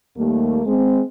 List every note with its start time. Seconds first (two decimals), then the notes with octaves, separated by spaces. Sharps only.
0.17 D#2 G3 A3 A#3
0.66 G#3 C4